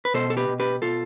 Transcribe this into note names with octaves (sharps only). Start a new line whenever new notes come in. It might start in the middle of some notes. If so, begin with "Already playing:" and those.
B4
B2 A4 C5
A4
G4 B4
B2
G4 B4
B2 F4 A4